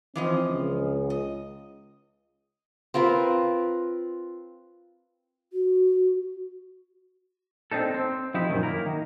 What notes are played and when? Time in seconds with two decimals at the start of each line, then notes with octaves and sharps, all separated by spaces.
0.15 E3 F3 C4 D#5
0.48 C#2
1.10 D#5
2.94 C4 F4 A#4 B4
5.53 F#4
7.72 C4 D4 D#4 A4
7.94 C4
8.34 F3 D#4 E4 G4
8.49 F#2 A#2 D#3
8.63 A#3 E4 A#4
8.86 D#3